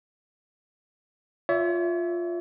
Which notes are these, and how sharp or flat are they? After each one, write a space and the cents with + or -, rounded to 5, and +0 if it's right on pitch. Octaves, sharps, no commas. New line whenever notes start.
F4 +0 C#5 +40 E5 +0